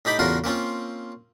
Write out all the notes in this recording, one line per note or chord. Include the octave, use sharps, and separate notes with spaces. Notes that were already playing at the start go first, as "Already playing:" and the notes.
A2 D#4 G4 B5 D6
E2 A2 C#3 F4 F#4 A#4
A#3 C4 C#4 F4